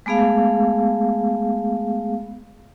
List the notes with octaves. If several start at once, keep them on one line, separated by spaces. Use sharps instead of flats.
G#3 A3 B3 G#4 F5